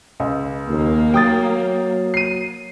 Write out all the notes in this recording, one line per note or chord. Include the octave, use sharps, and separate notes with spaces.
C#2
D#2 A#3
F#3 G5 D#6 A6
C7 D#7